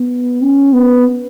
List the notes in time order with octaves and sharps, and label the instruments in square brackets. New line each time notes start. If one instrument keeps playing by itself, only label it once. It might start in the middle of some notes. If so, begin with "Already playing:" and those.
Already playing: [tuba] B3
C#4
B3